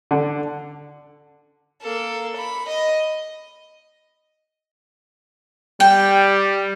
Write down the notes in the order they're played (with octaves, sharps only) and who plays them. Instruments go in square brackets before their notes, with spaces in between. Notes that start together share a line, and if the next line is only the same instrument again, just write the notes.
[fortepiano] D3
[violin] A#3 A4
B5
D#5
[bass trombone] G3 [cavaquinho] G5